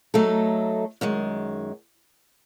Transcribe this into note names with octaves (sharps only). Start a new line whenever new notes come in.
F#3 A3 D#4 A4
F#2 D#3 G#3